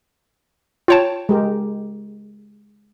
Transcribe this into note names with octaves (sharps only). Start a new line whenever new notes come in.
F4 C#5 G5 A5
G#3 G4 A#4